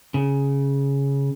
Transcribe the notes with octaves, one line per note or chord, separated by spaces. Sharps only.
C#3